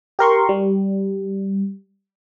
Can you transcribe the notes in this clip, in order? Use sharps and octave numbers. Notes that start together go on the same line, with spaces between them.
G4 A#4 C6 C#6
G3